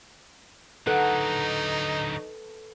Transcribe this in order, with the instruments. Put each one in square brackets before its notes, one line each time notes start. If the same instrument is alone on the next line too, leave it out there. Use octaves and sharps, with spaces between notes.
[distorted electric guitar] D3 F#3 [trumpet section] D#4 [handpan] A4 B4 [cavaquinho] F#5